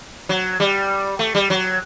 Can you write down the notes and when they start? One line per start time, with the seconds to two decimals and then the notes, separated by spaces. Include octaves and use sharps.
0.29 F#3
0.60 G3
1.19 A3
1.35 G3
1.50 F#3